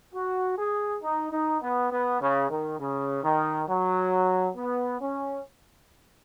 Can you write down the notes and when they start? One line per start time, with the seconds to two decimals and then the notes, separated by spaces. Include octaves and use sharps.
0.13 F#4
0.57 G#4
1.02 D#4
1.31 D#4
1.61 B3
1.90 B3
2.20 C#3
2.49 D#3
2.79 C#3
3.23 D#3
3.67 F#3
4.56 B3
5.00 C#4